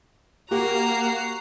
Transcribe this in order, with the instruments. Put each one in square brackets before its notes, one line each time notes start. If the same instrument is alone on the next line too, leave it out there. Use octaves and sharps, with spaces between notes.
[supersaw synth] A#3 [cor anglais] F#4 [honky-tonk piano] G4 [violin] A#5 C7